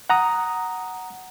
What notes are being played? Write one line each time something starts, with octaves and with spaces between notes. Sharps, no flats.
F#5 A#5 D#6